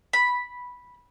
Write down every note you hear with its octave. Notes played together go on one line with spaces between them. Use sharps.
B5